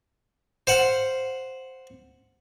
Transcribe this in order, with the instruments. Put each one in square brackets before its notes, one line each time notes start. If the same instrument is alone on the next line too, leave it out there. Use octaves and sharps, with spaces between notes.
[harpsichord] C5 F5 F#5